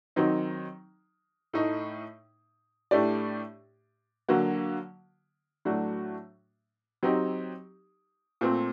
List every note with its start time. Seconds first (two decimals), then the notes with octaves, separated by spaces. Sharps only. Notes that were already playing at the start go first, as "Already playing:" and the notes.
0.16 D#3 F#3 C4 D#4
1.53 A2 A3 D#4
2.91 A2 A3 D4 G4 D5
4.29 D3 F#3 A#3 F#4
5.65 A2 F#3 A3 D4 F#4
7.03 F#3 C4 D#4 G4
8.41 A#2 A3 C4